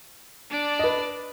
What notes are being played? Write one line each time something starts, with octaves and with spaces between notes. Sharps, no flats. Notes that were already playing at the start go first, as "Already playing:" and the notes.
D4 D5
B4 D#5